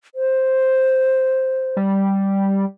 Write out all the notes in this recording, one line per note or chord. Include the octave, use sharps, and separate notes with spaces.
C5
G3